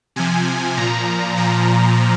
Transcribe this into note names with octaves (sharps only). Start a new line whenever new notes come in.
C3 F3 G#5
A#2 F3 A#5
A#2 F3